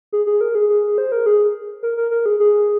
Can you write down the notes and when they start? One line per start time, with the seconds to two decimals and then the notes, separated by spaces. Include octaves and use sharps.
0.12 G#4
0.26 G#4
0.41 A#4
0.55 G#4
0.69 G#4
0.98 C5
1.12 A#4
1.26 G#4
1.83 A#4
1.97 A#4
2.11 A#4
2.26 G#4
2.40 G#4